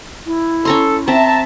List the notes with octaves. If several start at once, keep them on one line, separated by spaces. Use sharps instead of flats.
E4
C#4 A4 A#5 C6
C4 E5 A5 A#5